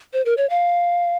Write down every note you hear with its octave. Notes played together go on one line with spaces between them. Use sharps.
C5
A#4
C#5
F5